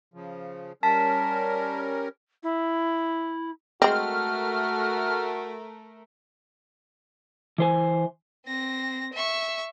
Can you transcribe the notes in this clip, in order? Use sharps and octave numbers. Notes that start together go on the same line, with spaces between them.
C#3 F3
G3 C#4 A#4 A5 B6
E4
G#3 A3 C4 F#4 A#4 F6
E3 C5 G#5
C4 A#6
E5 C#6